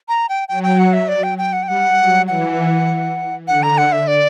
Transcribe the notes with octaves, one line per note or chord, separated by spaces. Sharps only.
A#5
G5
F#3 G5
G5
F#5
E5
D5
G5
G5
F#5
G5
G3 F#5
F#3
E3 F#5
D3 F#5
A#5
F#5
E5
D5